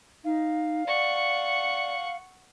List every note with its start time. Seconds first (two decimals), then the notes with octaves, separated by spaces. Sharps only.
0.25 D#4 F5
0.87 D5 F#5 C#6